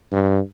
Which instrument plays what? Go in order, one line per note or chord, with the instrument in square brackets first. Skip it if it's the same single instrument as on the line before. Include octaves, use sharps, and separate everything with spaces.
[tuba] G2